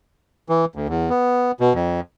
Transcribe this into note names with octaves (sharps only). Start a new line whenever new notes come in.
E3
D2
E2
B3
B2
F2